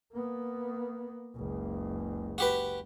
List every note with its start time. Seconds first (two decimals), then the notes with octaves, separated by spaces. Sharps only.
0.13 A#3 B3
1.35 F#1 C#2
2.38 F#4 G4 B4